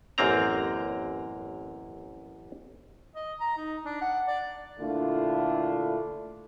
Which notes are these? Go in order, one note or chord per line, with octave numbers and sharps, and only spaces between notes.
A1 F#2 A#3 C4 A#5
D#5
A#5
D#4
D4
F#5
D5
A#2 D3 A3 D4 E4 F4